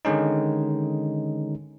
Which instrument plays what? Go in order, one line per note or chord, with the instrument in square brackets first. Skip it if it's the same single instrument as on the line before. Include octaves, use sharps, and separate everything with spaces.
[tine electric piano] D3 D#3 G#3 C#4 D#4